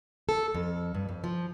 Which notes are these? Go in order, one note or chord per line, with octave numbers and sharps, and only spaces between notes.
A4
F2
G2
F2
F3